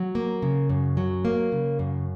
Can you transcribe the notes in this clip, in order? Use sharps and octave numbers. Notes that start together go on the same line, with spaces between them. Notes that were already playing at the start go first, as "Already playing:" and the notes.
Already playing: F#3
A#3
C#3
F#2
F#3
A#3
C#3
F#2